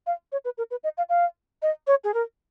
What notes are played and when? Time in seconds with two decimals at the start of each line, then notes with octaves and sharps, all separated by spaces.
0.07 F5
0.32 C#5
0.45 B4
0.58 A#4
0.71 B4
0.84 D#5
0.97 F5
1.09 F5
1.62 D#5
1.87 C#5
2.04 G#4
2.14 A#4